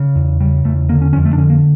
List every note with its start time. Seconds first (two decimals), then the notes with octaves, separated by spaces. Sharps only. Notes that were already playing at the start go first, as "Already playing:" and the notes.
Already playing: C#3
0.16 E2
0.40 C#3 G3
0.64 E2 A3
0.89 D3 A#3
1.01 C#4
1.13 F2 C#4
1.25 A3
1.33 D4
1.37 D3 C#4
1.50 A#3